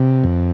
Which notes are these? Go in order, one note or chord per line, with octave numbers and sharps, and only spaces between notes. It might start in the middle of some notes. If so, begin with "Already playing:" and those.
Already playing: C3
F2